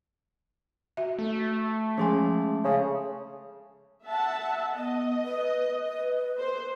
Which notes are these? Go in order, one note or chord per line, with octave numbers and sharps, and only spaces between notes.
F#4 E5
A3
F3 G#3 C#4 G#4 G#5 C6
C#3 C#4
E5 F#5 A5
B3 D#5
B4
B4
C5